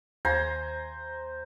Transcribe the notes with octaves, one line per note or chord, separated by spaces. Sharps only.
D#2 C5 G#5 A#5